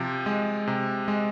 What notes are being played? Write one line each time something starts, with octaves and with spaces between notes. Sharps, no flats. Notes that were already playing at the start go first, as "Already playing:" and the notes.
Already playing: C3 F3
G#3
C3
G#3